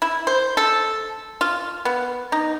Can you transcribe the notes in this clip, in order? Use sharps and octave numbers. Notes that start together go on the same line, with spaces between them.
E4
C5
A4
F4
B3
D#4